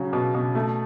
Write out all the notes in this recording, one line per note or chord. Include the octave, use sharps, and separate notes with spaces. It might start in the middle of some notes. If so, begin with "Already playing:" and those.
Already playing: C#3 F#3 C#4
B2
B2
A3